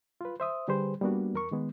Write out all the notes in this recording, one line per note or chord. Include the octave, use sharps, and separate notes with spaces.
F4 B4
C5 E5 D#6
D3 G3 G4 G#4 B4 C5
G3 A#3 B3 D4 F#4
E2 A#4 C#6
D#3 G#3 B3